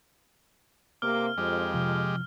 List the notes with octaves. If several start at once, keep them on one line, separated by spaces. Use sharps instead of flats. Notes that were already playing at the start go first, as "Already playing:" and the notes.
C3 A#3 D6 F6
F2 G#3 G4
C3 F3